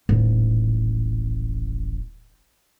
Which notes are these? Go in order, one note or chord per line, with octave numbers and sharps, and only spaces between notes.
D#1 A1